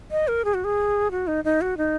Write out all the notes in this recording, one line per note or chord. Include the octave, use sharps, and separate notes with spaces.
D#5
A#4
G#4
F#4
G#4
F#4
D#4
D#4
F#4
D#4